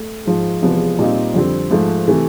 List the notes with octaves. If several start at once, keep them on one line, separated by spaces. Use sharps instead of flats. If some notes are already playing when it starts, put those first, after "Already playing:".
Already playing: A3
G#2 F3 G#3
E2 C3 F3 G#3 B3
A#2 G3 C4 D#4
F2 D3 G3 C4
G#2 F3 A3
C3 E3 A3